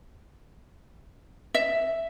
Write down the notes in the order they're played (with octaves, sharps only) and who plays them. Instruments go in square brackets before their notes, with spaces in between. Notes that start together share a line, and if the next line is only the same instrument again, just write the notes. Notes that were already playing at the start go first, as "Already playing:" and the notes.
[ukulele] E5